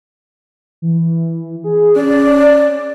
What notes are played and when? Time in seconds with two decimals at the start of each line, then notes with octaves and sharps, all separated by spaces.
0.82 E3
1.64 G#4
1.96 C#4 D5